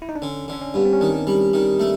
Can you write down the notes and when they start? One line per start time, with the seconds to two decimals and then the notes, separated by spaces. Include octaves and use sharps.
0.02 E4
0.09 D#4
0.15 D4
0.22 D3 C#4
0.48 D3 D4
0.62 C#4
0.74 G2 B3
0.85 C4
0.93 C#4
1.00 D#3 D4
1.27 G3
1.53 D#3
1.80 A3